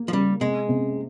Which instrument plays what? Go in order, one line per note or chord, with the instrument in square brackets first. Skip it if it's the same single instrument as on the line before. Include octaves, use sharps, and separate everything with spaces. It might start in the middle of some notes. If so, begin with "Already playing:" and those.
Already playing: [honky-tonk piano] A#3
[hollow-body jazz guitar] F3
[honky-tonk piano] C#3 [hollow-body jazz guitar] G3
[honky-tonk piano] C3 [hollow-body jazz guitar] G#3
[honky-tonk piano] C3